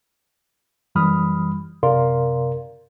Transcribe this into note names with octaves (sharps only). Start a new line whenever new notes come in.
F#2 E3 G3 B5 D#6 F6
F#2 C3 A#4 D5 F5 C6